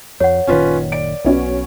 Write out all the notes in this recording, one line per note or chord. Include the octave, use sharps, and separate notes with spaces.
F2 C#5 F#5
F#1 A#2 D#3 C#4 F4 B4
D5 D7
B1 B3 C#4 F#4